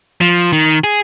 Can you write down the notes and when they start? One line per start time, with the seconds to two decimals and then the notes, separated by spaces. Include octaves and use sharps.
0.21 F3
0.52 D#3
0.84 G#4